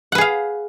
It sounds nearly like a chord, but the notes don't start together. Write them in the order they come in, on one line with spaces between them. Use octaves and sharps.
F#5 B4 G#4 F5